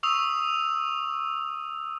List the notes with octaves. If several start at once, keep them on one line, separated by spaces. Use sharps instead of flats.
C#6 D#6 E6 F7